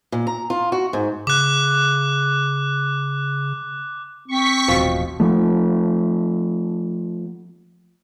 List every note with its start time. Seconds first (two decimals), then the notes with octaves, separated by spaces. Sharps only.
0.12 A#2
0.27 A#5
0.50 F4
0.72 F#4
0.93 G#2
1.27 C#3 D6 F#6
4.28 C4 C#6 B6
4.68 D#1 A1 B2 F3
5.20 F3 A3